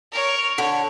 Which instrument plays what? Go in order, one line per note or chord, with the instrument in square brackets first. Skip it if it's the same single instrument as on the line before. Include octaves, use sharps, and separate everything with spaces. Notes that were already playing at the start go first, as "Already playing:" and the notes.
[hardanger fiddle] A#4 C#5
[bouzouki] D3 [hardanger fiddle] C#5